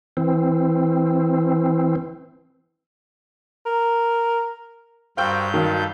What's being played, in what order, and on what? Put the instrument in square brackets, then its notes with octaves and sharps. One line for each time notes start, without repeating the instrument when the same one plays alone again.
[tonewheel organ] E3 C4
[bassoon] A#4
[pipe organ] G2 G6 [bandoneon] F#4 A#4 C5 [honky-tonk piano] F5 G5 E6
[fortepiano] D#3 [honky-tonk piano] F#3 [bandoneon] A4 F5